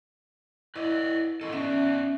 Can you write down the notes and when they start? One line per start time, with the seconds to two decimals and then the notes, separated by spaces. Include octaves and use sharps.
0.76 E4 B4 D5 D#5
1.41 C#4 E4 A4 D#5
1.53 B3 C#4 D#4 D5 E5